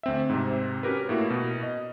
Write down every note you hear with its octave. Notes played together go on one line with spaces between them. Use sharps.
D2 C4 E5
G#2 C3
C#4 F#4 G4 A#4 B4
A2 A#3 E4 F#4
B2
D#5